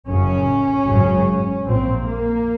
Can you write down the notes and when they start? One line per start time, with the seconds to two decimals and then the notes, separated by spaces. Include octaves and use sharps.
0.08 F#1 F#2 C#3 C#4
0.87 G#1 F#2 C#3
1.66 A#1 A#2 C4
2.05 A#3